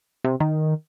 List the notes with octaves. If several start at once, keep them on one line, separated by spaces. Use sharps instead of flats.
C3
D#3